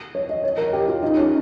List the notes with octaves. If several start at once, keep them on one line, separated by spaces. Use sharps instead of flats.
C#5
D#5
C#5
A#4
G4
F4
D#4
C#4